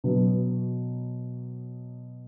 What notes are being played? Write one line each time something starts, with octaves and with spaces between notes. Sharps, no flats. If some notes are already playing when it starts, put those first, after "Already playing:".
B2 F#3 B3